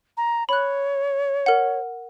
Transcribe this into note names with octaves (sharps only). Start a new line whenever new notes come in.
A#5
C#5 B5 F#6
A#4 F#5